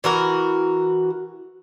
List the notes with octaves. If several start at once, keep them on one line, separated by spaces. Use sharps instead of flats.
E3 F#4 A#4